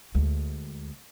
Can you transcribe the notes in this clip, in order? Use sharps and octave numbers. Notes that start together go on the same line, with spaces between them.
D2 G#3